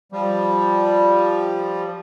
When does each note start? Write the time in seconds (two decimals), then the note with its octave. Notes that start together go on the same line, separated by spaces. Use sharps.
0.12 F3 G3